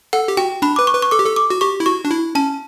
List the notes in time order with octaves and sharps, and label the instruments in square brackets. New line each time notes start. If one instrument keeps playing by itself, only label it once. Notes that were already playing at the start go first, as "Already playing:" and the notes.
[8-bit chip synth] A4 [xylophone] F#5
[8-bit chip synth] G4
[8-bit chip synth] F#4 [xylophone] G5
[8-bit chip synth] D4 [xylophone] B5
[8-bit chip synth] B4 [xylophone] D6
[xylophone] C#6
[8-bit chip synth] B4
[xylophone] C#6
[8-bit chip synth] A4 [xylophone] D6
[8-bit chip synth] G4
A4
[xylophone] D6
[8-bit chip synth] F#4
[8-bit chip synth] G4 [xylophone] C#6
[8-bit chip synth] E4
[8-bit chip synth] F#4 [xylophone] C#6
[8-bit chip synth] D4
E4
[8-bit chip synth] C#4 [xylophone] A5